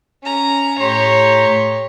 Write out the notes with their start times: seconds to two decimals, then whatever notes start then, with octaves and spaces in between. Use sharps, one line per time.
0.23 C#4 A#5
0.80 A2 G4 C#5 A#5 C6